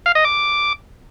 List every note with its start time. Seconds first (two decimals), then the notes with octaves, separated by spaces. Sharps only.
0.06 F5
0.15 D#5
0.25 D6